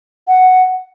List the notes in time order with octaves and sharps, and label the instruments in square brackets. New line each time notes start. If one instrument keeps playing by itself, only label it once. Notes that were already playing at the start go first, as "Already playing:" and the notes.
[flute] F#5